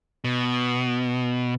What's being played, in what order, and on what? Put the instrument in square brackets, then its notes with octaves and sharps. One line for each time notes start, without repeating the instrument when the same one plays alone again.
[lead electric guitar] B2